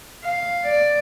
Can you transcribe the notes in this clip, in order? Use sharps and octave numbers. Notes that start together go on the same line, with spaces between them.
F5
D5